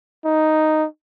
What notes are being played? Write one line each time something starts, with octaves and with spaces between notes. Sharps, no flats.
D#4